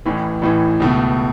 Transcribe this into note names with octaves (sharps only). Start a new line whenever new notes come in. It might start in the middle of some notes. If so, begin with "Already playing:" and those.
A1 A2 E3
A1 A2 E3
C#2 B2 A3